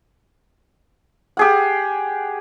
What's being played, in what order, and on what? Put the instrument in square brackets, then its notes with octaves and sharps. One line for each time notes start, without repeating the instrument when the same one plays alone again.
[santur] G4 G#4 F#5